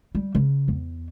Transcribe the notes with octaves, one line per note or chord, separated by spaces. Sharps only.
G3
C#3
E2